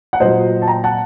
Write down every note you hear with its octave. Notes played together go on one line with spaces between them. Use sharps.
F#5
A#2 F#3 C5 D#5
A5
G5 A#5
F#5 A5